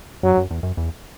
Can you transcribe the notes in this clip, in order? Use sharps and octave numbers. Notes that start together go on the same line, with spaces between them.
F#2 F#3
F#2
E2
F#2
E2